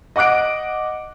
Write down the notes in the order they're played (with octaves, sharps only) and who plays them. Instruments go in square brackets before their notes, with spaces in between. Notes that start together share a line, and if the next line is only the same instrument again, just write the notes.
[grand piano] D#5 F#5 D6 F#6 D7